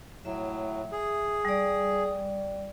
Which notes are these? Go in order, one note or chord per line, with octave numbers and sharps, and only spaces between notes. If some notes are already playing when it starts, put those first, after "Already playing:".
A2 F#3 E5
G#4
G3 D5